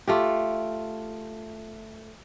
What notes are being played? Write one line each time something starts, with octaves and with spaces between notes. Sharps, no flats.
A3 F4 G4